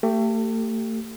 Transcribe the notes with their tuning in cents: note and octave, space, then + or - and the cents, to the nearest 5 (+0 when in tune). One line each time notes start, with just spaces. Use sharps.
A3 +35 G4 +0